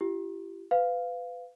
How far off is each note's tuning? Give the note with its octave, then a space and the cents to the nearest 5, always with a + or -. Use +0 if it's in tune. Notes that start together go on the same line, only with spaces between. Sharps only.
E4 +45 G4 -15
B4 +30 F5 +0